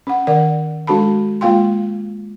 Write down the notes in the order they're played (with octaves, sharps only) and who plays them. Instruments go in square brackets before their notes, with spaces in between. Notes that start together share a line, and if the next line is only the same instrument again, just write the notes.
[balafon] C#4 F#5
D#3 A#4 D5 F#5
G#3 D4 F#4 A4 A5 B5
G#3 A#3 F4 F5 G5 C6